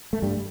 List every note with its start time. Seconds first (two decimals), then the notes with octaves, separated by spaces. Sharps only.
0.13 A3
0.22 G2 G3